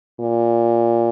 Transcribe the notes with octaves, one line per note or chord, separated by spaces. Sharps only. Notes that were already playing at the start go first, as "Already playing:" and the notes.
A#2